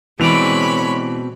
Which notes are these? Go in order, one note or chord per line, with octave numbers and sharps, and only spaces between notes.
B2 E3 G#3 C4 C#5 D5 B5 F7